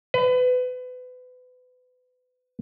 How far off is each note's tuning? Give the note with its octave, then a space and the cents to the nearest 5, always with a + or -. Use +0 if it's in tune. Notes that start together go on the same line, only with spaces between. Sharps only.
B4 +30